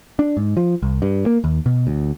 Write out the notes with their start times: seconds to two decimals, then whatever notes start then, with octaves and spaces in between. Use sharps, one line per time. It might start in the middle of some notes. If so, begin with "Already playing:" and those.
0.19 D4
0.37 G#2
0.57 F3
0.83 C2
1.02 G2
1.26 A#3
1.44 D#2
1.66 B2
1.87 D2